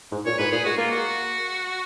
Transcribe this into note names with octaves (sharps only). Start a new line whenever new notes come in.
G#2
A#2 C#5
G#2 B4
A#2 G#4
G#3 F#4
A#3 F4
F#4